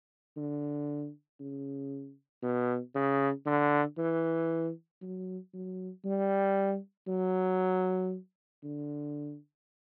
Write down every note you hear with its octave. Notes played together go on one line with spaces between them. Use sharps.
D3
C#3
B2
C#3
D3
E3
F#3
F#3
G3
F#3
D3